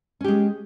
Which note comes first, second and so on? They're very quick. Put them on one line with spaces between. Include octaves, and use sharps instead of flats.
C#4 G4 G#3